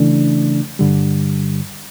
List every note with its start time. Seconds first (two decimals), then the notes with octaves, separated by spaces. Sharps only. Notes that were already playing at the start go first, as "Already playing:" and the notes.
Already playing: C#3 E3 A3 D4
0.79 G2 D3 G3